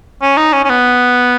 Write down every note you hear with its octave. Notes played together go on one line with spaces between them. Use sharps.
C#4
D#4
C#4
C#4
B3